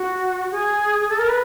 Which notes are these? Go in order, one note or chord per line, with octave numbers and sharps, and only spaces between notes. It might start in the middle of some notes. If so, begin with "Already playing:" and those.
Already playing: F#4
G#4
A4
A#4
B4